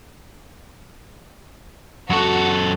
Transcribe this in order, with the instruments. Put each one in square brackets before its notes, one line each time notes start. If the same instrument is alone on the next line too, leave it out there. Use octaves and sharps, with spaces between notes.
[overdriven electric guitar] F#2 A4 [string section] F#4